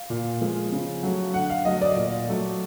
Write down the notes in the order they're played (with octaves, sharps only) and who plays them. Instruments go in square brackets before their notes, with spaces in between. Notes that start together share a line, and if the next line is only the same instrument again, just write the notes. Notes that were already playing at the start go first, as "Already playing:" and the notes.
Already playing: [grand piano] F5
A#2
F3 G#3
C#3
F#3 A3
D3 F#5
F5
F#3 A3 D#5
D5
A#2
F#3 A3